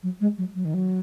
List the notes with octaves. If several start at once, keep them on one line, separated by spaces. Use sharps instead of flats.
F#3
G#3
F#3
F#3
D#3
F#3